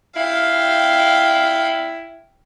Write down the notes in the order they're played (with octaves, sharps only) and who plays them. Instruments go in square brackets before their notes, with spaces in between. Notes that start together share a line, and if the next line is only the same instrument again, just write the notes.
[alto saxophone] E4 [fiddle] F5 G5